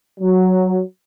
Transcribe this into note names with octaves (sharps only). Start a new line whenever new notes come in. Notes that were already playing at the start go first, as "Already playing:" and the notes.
F#3